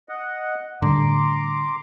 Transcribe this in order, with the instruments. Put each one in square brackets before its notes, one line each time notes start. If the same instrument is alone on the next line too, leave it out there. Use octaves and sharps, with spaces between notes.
[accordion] D#5 F#5
[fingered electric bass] A2 G3 [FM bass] D3 [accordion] A#5 C6 D6